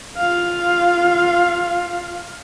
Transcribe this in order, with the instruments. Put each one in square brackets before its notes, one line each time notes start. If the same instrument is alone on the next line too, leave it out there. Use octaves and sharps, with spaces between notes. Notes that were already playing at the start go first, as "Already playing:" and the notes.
[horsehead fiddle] F4 F5